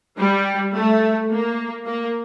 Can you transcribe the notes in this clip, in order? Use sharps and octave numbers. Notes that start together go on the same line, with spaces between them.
G3
A3
A#3
A#3